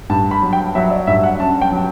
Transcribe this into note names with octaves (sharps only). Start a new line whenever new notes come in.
G2 A5
B5
F#3
G5
F#3 E5
D5
G2 E5
F#5
C#4 A5
G5
F#3